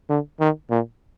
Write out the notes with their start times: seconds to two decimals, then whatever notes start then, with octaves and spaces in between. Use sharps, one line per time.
0.10 D3
0.40 D#3
0.70 A#2